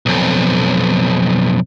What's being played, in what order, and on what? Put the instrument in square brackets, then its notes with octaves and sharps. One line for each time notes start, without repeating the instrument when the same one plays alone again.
[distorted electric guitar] B1 F2